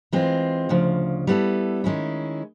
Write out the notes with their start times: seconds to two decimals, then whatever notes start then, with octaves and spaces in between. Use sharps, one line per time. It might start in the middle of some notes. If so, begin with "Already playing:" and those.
0.13 E3 G#3 C4 F4
0.69 D2 C#3 F3
1.27 G3 B3 E4 A4
1.84 D#3 G#3 C#4 E4